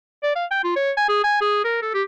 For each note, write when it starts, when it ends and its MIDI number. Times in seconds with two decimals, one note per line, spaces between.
0.23 0.32 74
0.36 0.45 77
0.51 0.64 79
0.64 0.73 65
0.76 0.91 73
0.97 1.07 80
1.09 1.20 68
1.24 1.37 80
1.41 1.63 68
1.64 1.77 70
1.82 1.93 69
1.94 2.03 67